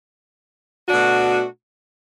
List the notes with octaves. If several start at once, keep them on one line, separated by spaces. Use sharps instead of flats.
B2 A3 D4 F#4